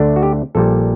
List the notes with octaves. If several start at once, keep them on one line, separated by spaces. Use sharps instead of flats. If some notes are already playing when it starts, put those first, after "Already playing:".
Already playing: D2 D3 A3 D4
F#4
G4
A#1 A#2 G3 A4